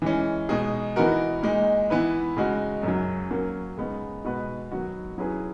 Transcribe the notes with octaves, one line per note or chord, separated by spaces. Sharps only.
E3 G#3 C#4
B2 G#3 D#4 G#4
E3 B3 D#4 F#4 A#4
A#2 G#3 D#4
E3 B3 E4 B4
C#3 G#3 D#4 F#4
F#2 C#3 F#3
F#3 A#3 C#4
C#3 G#3 B3 D#4
B2 G#3 B3 F#4 B4
D#3 F#3 B3 F#4
F#3 C#4 E4 G#4 B4